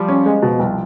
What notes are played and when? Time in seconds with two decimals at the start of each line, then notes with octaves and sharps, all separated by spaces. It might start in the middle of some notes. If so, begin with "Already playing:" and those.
Already playing: F3 G3
0.08 C#4
0.26 G#3
0.42 B2 F3
0.59 C2